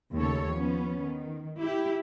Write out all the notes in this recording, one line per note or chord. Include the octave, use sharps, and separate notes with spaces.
D#2 C#3 A3 A4 C#5
F3 B3 C#4
D#3
E4 G4